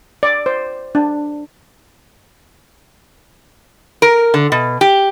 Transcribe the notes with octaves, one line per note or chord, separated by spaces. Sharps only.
D5
C5
D4
A#4
D3
B2
G4